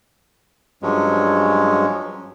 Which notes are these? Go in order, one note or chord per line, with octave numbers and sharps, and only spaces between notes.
G2 F3 F#3 G#3 C#4